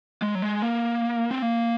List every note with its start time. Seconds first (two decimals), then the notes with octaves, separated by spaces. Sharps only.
0.22 G#3
0.35 F#3
0.42 G#3
0.62 A#3
1.31 C4
1.42 A#3